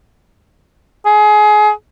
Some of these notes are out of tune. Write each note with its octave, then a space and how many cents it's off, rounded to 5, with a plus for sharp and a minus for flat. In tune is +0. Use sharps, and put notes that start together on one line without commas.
G#4 +25